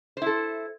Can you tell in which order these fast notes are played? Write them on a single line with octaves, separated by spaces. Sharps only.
C5 E4 A4